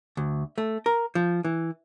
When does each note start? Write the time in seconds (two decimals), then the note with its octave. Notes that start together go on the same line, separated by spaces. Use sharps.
0.17 D2
0.58 A3
0.86 A#4
1.15 F3
1.45 E3